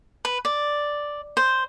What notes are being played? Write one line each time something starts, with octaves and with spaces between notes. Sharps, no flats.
B4
D5
C5